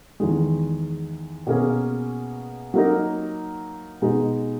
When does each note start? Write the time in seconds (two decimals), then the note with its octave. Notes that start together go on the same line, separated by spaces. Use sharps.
0.20 E2 D#3 G#3
1.47 B2 A#3 C#4 G#4
2.74 F#3 A#3 D#4 A#4
4.02 B2 G#3 D#4 G#4